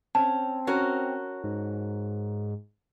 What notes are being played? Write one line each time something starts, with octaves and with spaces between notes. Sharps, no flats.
C4 C#4 A5
C#4 F#4 A#4
G#2